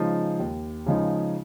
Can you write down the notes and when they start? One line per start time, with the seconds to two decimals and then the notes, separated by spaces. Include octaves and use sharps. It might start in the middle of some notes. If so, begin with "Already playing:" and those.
Already playing: C#3 F3 G#3 D#4
0.40 D#2
0.86 C#3 F3 G#3 D#4